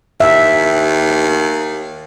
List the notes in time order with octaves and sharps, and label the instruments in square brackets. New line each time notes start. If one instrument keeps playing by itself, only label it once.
[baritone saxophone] D#2 [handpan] E5